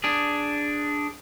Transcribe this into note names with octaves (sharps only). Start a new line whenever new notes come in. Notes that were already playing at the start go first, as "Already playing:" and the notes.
D4 G#4